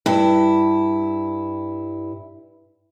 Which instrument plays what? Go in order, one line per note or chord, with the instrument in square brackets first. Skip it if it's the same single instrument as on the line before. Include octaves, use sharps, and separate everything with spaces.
[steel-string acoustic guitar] G2 E4